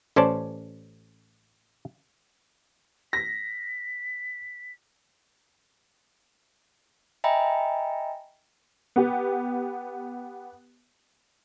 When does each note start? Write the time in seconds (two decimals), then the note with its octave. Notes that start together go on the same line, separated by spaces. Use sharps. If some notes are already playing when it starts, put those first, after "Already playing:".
0.16 A1 C#4 C5 D5 A5
3.13 A#6 B6
7.24 D#5 E5 G5 G#5 A#5 B5
8.96 B3 G4